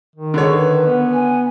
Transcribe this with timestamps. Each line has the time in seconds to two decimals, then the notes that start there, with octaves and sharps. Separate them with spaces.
0.16 D#3
0.34 D3 G#4 C#5
0.50 B4
0.86 B3
1.12 G#5